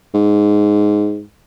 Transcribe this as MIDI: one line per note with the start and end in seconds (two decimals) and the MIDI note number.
0.14 1.22 44